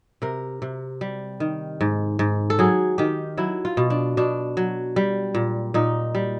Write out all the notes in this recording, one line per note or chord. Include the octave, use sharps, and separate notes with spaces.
C3 A#4
C3
G3
D#3
G#2
G#2
A4
F#3 G#4
D#3 G4
F#3 E4
F4
B2
D4
B2 D4
F#3
G3
A#2
A#2 D#4
G3